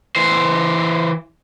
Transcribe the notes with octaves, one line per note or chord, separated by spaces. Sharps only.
E3 C5